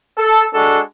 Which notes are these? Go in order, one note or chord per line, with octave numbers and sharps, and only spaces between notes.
A4
G#3 D4 F#4 A4